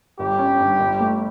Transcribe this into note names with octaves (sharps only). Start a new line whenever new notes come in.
G1 G4
C#4
G2
G1
A3